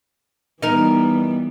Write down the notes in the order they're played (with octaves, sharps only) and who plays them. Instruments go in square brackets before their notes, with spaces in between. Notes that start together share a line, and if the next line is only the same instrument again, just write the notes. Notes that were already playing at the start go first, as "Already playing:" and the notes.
[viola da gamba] E3 G3 B3 [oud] D#4 A#4